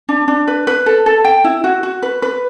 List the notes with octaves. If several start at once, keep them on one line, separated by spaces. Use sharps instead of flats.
D4
D4
B4
B4
A4
A4
G5
E4
F#4
F#4
B4
B4